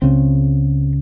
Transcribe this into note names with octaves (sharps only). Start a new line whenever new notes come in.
C#2 C#3 C4